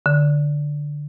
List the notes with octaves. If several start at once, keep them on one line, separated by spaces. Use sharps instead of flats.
D3